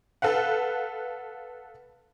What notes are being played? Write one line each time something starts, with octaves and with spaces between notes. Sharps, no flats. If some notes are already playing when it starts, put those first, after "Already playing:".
A4 B4 F5 F#5